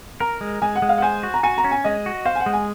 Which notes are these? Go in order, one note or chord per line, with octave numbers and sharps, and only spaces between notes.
A#4 A#5
G#3
G#3 G#5
F#5
G#3
F5
F#5
C5 G#5
F#4
A#5
F#4 G#5
A#5
C#4
G#5
G#3 D#5
F#4
C5 F5
G#5
F#5
G#3
G#5